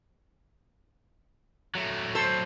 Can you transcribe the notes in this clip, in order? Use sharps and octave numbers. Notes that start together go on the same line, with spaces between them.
F#3 A3
A4 C5